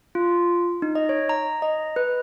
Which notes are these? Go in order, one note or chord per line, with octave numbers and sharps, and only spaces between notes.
F4
D#4
D#5
C#5
A#5
D#5
B4